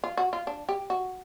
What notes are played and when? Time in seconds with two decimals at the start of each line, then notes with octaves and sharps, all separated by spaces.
0.04 F4
0.17 F#4
0.33 F4
0.47 D4
0.69 G4
0.90 F#4